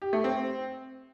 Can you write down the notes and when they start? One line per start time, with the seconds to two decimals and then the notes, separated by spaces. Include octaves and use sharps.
0.02 G4
0.13 A3
0.24 C4